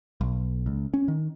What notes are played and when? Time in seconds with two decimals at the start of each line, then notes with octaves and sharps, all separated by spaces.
0.21 B1
0.66 C#2
0.94 C#4
1.08 D#3